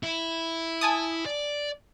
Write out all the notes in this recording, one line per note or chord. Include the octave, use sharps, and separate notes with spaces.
E4
G#5 A5 D#6
D5